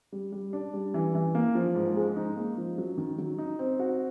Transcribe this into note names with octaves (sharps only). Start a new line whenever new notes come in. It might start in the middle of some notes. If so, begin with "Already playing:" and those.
G3
G3
D4
G3
E3
E3
A#3
F3
G#2
G#3
D#4
A#3
F3
F#3
D#3
F#3
D#4
C4
F#4